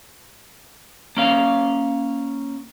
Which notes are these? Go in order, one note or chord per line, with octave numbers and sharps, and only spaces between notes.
A#3 C#4 F5